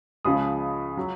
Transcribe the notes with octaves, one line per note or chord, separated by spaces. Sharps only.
C#2 C#3 F3 B5 D#6
F#3